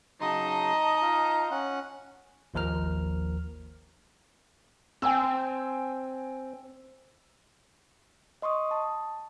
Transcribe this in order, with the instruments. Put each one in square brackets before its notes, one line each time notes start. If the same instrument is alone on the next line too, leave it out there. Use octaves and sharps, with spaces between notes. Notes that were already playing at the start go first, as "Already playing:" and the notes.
[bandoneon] C#3 F#3 C6 [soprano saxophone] D#4 [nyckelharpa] D#5 [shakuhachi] A5
[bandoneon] F4
C#4 F#5
[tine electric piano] G#1 D#2 F3 A#4 F6
[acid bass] C4 [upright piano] G5 G#5 E6
[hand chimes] D#5 C6 C#6 D#6
A5